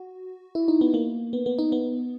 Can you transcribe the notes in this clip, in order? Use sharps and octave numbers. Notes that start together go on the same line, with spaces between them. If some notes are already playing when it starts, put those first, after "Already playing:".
Already playing: F#4
E4
D#4
B3
A#3
B3
B3
D#4
B3